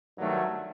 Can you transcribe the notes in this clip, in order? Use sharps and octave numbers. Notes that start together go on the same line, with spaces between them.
G2 D#3 F#3 A3